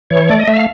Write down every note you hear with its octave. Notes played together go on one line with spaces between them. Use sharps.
E3 C#5
A3 D5
D#5
A3 E5
F5